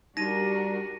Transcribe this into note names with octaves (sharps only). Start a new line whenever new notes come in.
G3 D4 D#4 F#4 G4 A#4 A#6 D#7